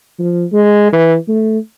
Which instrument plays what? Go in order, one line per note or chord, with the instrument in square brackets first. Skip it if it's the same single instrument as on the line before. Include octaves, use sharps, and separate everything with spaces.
[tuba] F3
G#3
E3
A3